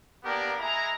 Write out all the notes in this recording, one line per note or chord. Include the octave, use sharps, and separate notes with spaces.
A#3 B3 D4 G4 A#4
G#3 E4 A#5